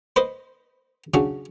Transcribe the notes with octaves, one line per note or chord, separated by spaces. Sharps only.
B4 C5 D#5
C#3 F#3 C#4 D4